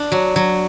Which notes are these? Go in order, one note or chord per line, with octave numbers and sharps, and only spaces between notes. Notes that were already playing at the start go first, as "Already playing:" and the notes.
Already playing: D4
F#3
F#3